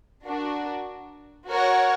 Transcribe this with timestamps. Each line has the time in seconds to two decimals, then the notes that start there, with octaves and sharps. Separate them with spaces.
0.25 D4 F#4 A#4
1.50 F#4 A#4 C#5 F#5